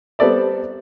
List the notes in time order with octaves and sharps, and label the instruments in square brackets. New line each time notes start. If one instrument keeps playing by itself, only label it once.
[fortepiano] G3 B3 C4 A4 D5 E5